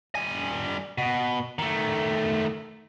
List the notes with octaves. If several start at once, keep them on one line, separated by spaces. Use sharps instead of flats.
G3 G#5
B2
D#3 A3